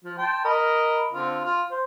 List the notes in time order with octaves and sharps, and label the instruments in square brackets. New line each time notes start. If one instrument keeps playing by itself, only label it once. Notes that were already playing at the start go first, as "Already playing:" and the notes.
[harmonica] F3
G5 A5 C6
A#4 D#5 B5
D3 C4 F4
F4
C5